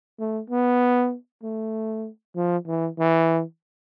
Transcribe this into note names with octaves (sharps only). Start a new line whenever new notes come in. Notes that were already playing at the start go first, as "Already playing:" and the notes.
A3
B3
A3
F3
E3
E3